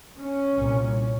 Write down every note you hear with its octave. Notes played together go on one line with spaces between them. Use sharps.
C#4
C2 A#2